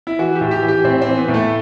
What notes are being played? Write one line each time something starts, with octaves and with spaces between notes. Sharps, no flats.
E4
E3 F#4
G4
A2
G4
E3
G4
A2 C4
E3 C4
B3
A2
A3